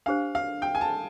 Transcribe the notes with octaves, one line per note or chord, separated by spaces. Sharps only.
D4 G4 C5 F5
F5
G5
G#5
A5